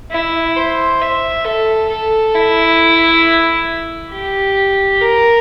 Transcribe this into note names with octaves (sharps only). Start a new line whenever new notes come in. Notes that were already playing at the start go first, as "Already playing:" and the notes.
E4
C5
E5
A4
A4
E4
G4
A#4